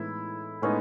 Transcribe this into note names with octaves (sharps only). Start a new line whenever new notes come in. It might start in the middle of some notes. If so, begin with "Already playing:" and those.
Already playing: A2 E3 G#3 B3 D#4 E4
A2 G#3 B3 C#4 D#4